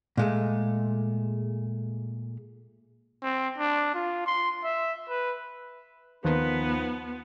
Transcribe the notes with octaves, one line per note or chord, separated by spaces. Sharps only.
A#2 G#3 A3
C4
D4
F4
C6
E5
B4
D#2 D#3 F3 B3 D#4 B4